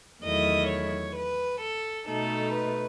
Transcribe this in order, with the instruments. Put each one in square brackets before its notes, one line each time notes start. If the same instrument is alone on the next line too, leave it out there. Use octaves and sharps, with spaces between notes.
[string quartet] E2 D#3 F#3 A3 E4 D#5
C#5
B4
A4
B2 A3 D#4 A4
B4